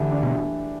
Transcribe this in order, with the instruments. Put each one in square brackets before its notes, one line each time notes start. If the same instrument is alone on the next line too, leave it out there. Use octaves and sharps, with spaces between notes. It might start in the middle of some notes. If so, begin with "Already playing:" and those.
Already playing: [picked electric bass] D3 [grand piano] E3 A3 G4
[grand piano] D4
[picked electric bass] B2